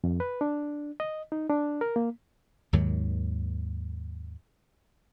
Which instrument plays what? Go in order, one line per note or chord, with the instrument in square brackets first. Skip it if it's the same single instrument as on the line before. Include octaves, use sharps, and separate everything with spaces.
[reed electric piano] F2
B4
D4
D#5
D#4
D4
A#4
A#3
[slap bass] D#2 G#2 D#3 F#3